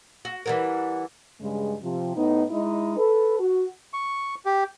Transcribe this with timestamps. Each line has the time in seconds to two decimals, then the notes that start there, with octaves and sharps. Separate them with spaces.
0.25 F#4
0.46 E3 G3 A#4 F#5
1.40 G2 C#3 G#3
1.82 C3 F3
2.16 A2 B3 D#4
2.51 G#3 D#4 E4 D#5
2.97 A4 B4
3.39 F#4
3.93 C#6
4.45 G4